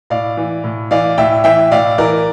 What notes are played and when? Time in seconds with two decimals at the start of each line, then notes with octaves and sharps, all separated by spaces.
0.10 A2 D5 F5
0.37 E3
0.64 A2
0.91 E3 D5 F5
1.18 A2 E5 G5
1.44 E3 E5 G5
1.71 A2 D5 F5
1.98 E3 A#4 D5